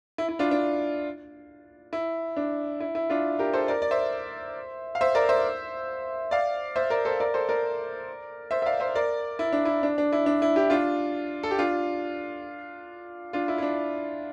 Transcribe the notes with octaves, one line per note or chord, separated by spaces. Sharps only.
E4
E4
D4 F4
D4
E4
D4
E4
E4
D4 F4
G4 A#4
A4 C5
A#4 D5
D5
C5 E5
F5
C5 E5
A#4 D5
C5 E5
D5 F5
C5 E5
A#4 D5
A4 C5
A#4 D5
A4 C5
A#4 D5
C5 E5
E5
D5 F5
C5 E5
A#4 D5
E4
D4
E4
D4
D4
E4
D4
E4
E4 G4
D4 F4
A4
G4
D4 F4
D4 F4
E4
E4
D4